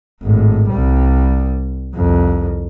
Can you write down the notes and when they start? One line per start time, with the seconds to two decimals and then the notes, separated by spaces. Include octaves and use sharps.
0.23 G#1 A2
0.69 C2 G3
1.96 C2 F2